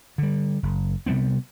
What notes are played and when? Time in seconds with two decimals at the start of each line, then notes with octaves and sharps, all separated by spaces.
0.18 D3 G3
0.63 F#1
1.06 C3 G3 B3 C4